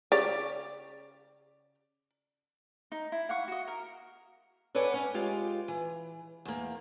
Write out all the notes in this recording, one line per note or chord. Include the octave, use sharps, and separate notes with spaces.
C#3 G4 C#5 D5
D#4
E4
F5 F#5 C#6
F#4 D#5
A#4
A4 B4 C#5 D5 F#5 G#5
C#4
G#3 F4 G4
E3
E2 A#3